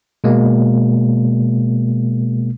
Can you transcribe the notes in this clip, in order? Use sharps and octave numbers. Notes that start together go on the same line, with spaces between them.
B2 G#3 A#3